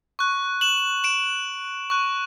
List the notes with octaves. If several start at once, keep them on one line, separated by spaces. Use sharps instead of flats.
C#6 F#6
E7 F#7
D7 E7
C#6 F#6